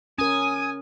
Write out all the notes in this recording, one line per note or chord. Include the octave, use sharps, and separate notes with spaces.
C#4 A#4 G#5 D#6